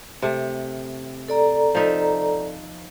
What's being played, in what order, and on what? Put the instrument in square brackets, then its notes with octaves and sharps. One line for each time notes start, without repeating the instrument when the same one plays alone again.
[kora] C3 A3
[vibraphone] A4 D5 A#5
[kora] F3 D#4 E5